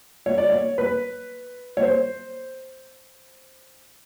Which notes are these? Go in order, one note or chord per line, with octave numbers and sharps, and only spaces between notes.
C#5
D5
C#5
B4
C#5
C5